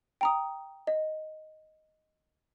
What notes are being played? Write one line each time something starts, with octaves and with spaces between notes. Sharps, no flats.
G5 A#5 D#6
D#5